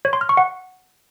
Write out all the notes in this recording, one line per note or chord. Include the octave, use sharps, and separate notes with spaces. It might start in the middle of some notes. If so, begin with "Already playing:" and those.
C#5
C6
F6
C#6
F#5